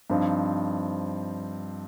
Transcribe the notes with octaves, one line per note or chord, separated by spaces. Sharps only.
G2 F3 C4 D#4